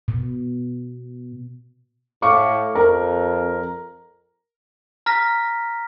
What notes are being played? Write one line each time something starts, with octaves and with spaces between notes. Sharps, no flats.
B2
A2 F5 C#6 D6
F2 A#4
A#5 F6 A#6 B6